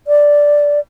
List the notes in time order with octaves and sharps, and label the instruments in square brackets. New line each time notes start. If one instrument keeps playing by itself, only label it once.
[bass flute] D5